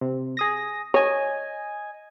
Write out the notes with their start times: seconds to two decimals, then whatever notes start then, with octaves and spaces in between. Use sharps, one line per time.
0.01 C3
0.37 G#4 D#6 A#6
0.94 C#5 D#5 G#5